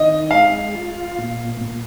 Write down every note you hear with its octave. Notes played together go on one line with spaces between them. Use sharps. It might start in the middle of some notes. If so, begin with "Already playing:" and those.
Already playing: D#3 D#5
G#3 F5
F4
A#2
A#2